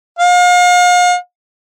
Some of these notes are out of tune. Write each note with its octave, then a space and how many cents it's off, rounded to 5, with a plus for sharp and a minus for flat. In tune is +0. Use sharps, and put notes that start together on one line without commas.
F5 +40